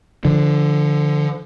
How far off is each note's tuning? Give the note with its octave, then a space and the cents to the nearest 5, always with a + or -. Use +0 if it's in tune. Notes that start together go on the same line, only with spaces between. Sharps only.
D3 +0 F3 -20